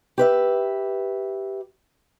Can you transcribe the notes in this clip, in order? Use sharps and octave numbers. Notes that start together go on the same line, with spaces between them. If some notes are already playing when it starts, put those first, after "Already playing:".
G4 B4 E5